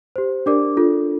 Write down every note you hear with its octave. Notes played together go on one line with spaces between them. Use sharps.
G4 C5
D4 G4 A#4 D5 D6
D4 F4 A4